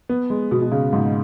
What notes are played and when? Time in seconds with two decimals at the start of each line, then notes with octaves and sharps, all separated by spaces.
0.09 B3
0.30 G#3
0.51 B2
0.62 B2
0.72 C#3
0.93 G#2